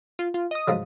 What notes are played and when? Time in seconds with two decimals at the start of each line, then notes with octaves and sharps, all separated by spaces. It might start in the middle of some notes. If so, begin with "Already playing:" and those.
0.19 F4
0.34 F4
0.51 D#5 D#6
0.68 G#2 F3 F#3